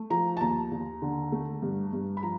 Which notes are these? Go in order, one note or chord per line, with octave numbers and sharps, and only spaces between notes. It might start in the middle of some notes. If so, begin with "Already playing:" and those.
Already playing: A3
F3 A#5
A5
D#2 A#5
D#2
D3
A3
G2
G2
B5
F3 A#5